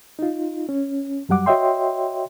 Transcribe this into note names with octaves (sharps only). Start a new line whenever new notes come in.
D#4 F4
C#4
F#2 F#3 G3 F#5 D6
F#4 C#5 D#5 E5 G5 C6